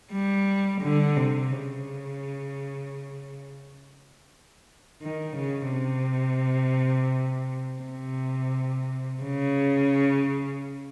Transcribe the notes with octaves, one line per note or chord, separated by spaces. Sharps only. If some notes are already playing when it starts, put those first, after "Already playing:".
G3
D3
C3
C#3
D#3
C#3
C3
C3
C#3